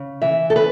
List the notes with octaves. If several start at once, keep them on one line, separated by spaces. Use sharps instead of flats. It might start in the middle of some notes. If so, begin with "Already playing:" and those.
Already playing: C#3
E3 E5
A4
C#3 B4